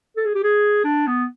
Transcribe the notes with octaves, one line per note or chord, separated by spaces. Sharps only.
A4
G#4
G4
G#4
D4
B3